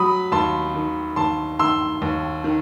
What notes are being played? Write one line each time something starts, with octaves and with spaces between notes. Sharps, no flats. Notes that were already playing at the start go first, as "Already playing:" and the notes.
Already playing: F#3 B5 D#6
D#2 A5 C6
D#3
D#2 A5 C6
D#3 C6 E6
D#2
D#3